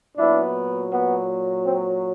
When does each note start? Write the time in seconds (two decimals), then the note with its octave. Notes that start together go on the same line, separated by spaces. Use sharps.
0.17 A#2 F#3 B3 D4 E4
0.92 B3
1.66 C4